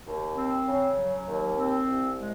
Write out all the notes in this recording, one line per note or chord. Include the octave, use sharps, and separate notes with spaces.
D#2
C4
C#3
F#3
D#2
C4
C2
G#3